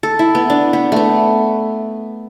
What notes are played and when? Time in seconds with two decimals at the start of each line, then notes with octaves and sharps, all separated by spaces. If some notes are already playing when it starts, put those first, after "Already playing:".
0.03 A4
0.19 E4
0.35 B3
0.50 D4
0.73 B3
0.92 A3 B3